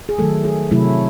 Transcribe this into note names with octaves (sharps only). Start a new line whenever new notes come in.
G#4
D#3 F#3 A3 A4
G#4
C3 F#3 A3 E4